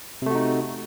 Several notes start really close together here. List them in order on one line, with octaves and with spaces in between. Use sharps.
C3 A3 F#4 D#4